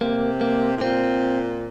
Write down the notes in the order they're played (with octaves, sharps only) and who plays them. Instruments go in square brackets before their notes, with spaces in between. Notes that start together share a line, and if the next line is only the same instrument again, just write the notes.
[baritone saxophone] C3 [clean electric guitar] A#3
[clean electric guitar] A#3
[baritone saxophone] A2
[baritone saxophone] A#2 [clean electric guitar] C4